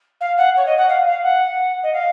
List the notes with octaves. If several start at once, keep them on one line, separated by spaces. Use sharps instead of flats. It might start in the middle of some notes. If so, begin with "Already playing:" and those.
F5
F#5
C#5
D#5
F#5
F5
F5
F#5
D#5
F5